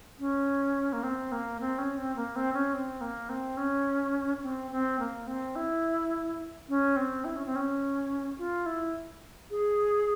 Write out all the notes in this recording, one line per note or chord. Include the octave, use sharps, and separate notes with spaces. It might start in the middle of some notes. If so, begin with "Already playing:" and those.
C#4
A#3
C4
A#3
C4
C#4
C4
A#3
C4
C#4
C4
A#3
C4
C#4
C4
C4
A#3
C4
E4
C#4
C4
E4
C#4
C4
C#4
F4
E4
G#4